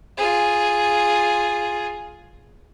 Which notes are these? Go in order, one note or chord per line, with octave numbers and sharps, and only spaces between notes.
F4 G#4